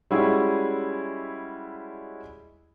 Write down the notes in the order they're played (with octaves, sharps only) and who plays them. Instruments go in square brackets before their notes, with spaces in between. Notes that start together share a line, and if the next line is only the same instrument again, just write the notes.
[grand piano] G3 G#3 C#4 E4 F#4 G#4